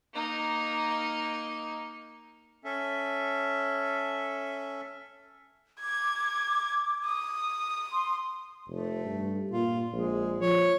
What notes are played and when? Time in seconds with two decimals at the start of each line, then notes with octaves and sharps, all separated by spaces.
0.13 A#3 D#4
2.65 C#4 A4 E5
5.81 D6 G#6
7.05 D#6
7.91 C6
8.68 F1 A3
9.06 G2
9.52 A#2 F4
9.93 A#1 G#3
10.41 F3 C#5